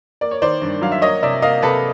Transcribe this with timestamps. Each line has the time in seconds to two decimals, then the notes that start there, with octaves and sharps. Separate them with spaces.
0.21 A#3 D5
0.31 C#5
0.42 D#3 C5 D5
0.62 G2
0.81 F#3 F5
0.92 E5
1.02 A#3 C#5 D#5
1.22 C3 D5 E5
1.42 A#3 D#5 F5
1.62 C3 A4 B4